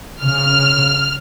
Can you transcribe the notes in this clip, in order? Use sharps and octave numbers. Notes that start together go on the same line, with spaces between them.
C#3 F6